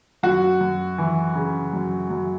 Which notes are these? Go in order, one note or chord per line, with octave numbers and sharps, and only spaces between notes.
F#2 F#4
F#2
E3
C#3
F#2
F#2